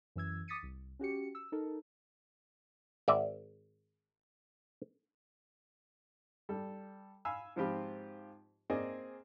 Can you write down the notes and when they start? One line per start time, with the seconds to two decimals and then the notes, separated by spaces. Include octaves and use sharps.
0.16 F#2 E3 E6 G#6
0.48 D6 D#6 A6 B6 C#7 D#7
0.63 C2
0.99 C#4 F#4 G4 C#7
1.35 E6
1.52 D#4 A4 A#4
3.08 G#1 D5 E5
6.49 G3 A4
7.25 F5 G#5 B5 E6
7.56 G#2 F3 C4 F4 G4 B5
8.70 A#3 C4 G#4 D5 D#5 G#5